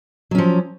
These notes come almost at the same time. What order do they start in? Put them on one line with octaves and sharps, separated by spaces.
F#3 C#4 F3